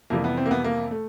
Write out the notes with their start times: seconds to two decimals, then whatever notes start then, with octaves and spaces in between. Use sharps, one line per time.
0.10 F2 C3 E3 G3 A#3
0.24 B3
0.37 C4
0.46 A#3
0.51 B3
0.64 A#3
0.91 A3